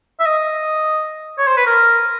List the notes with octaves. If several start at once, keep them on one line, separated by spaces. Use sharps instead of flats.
E5
D#5
C#5
C5
B4
A#4